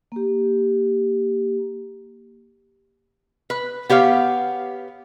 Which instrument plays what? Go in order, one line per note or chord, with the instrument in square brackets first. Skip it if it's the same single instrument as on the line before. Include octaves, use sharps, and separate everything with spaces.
[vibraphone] A#3 G4
[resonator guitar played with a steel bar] B4
B3 G4 C#5 F5